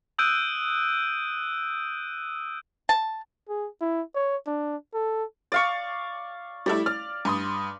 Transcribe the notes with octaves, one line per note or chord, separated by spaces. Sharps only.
D#6 E6 F#6 G6 D7 D#7
A5
G#4
E4
C#5
D4
A4
D5 F5 C#6
G3 A3 E4 D5
D5 F6
G2 C6 D#6